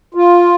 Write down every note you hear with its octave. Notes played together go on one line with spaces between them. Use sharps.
F4